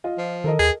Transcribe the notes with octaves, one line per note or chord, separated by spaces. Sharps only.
F4 D#5
F3
D#3 A4 A#4 D#5
D#2 G#4